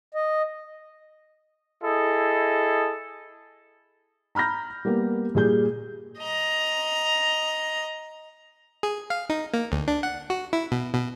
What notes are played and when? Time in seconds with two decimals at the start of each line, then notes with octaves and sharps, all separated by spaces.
0.15 D#5
1.84 E4 G#4 A4 D#5
4.35 A#5 B5 F6 G6 A#6
4.85 G3 A#3 B3 G4
5.35 A#2 G3 G#4 G6
6.18 D#5 A#5
8.83 G#4
9.10 F5
9.30 D#4
9.54 A#3
9.72 D2
9.88 D4
10.03 F#5
10.30 F#4
10.53 E4
10.72 B2
10.94 B2